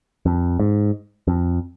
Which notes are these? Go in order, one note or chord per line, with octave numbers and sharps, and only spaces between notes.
F2
G#2
F2